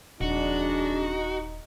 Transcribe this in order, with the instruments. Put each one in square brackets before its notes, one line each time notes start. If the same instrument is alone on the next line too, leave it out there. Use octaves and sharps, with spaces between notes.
[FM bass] D#1 [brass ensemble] F2 G#3 D4 [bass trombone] D#4 [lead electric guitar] F#4